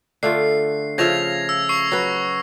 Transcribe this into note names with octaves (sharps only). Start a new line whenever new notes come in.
D3 A3 F4 C7
C#3 F3 E5 G#6 A#6 F7
E6
C#6 C7
F#3 B4